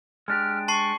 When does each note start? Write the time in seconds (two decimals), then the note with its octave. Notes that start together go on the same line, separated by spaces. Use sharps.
0.28 G#3 D4 G4 F6
0.68 A5 C6 C#6 C7